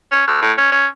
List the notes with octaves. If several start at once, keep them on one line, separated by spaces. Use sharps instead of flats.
C#4
D2
A2
C#4
C#4